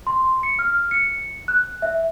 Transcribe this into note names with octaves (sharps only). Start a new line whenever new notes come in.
C6
C#7
F6
C#7
F#6
E5